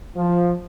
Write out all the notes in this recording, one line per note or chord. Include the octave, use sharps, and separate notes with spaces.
F3